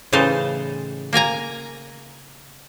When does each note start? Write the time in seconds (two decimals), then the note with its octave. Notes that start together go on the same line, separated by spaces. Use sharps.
0.13 A2 C#3 E3 D#4 C5 A5
1.13 A#3 A#4 G#5 A#5